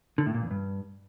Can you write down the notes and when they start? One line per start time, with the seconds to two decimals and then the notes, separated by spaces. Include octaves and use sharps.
0.18 D3
0.26 A2
0.34 A#2
0.43 E2
0.51 G2